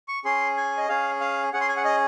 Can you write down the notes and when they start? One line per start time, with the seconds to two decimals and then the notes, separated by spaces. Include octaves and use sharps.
0.08 C#6
0.25 C#4 G#4 C6
0.57 G#5
0.77 D#5
0.89 C#4 G#4 F5
1.21 F5
1.53 C#4 G#4 F#5
1.61 C6
1.69 G#5
1.77 F#5
1.85 D#5